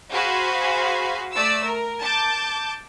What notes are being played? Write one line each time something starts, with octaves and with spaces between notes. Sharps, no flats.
F#4 G#4 C5 F5 G#5 B5
A3 D5 E6
A#4
A5 D6 G6